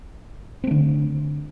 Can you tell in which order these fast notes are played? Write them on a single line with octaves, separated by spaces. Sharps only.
C4 A3 D3